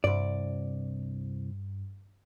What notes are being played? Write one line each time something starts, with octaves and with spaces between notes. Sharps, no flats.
C2 G2 D5